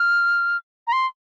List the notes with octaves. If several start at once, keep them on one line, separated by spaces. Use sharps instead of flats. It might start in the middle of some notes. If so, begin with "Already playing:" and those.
Already playing: F6
A#5
C6